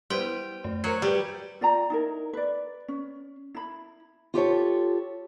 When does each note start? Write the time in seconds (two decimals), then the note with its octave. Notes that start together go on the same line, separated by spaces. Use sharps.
0.10 G3 B3 E4 C5 G5 C6
0.64 F#2 A3
0.84 F#3 A#4 C5 G#6 C#7
1.02 G3 G4 B4 D5
1.61 F4 D5 G5 A#5
1.90 D#4 E4 A#4
2.33 B4 D5
2.88 C#4
3.55 E4 B5
4.34 F4 G4 A4 C#5